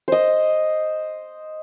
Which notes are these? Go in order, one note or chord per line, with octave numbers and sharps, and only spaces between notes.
C5 D#5